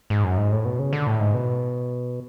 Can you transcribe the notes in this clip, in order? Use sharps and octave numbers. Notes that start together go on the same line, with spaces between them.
G#2
F#2
G#2
A2
B2
C#3
D3
A2
G#2
B2